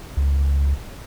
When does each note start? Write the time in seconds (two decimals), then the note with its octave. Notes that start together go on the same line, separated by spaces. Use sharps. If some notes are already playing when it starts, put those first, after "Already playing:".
0.17 C#2